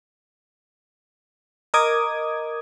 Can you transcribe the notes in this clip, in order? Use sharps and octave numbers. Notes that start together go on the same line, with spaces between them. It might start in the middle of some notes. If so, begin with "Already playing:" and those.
A#4 D#5 D6 D#6 G#6